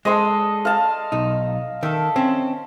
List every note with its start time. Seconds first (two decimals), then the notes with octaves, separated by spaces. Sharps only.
0.05 G#3 D4 A4 D#5 C6
0.65 F5 A5
1.12 B1 D#4
1.83 D#3 A4 E5
2.16 C4 C#4